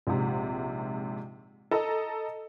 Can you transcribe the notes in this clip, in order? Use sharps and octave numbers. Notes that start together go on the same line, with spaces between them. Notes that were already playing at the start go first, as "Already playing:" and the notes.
A#1 G#2 C3
A4 D#5 A#5 E6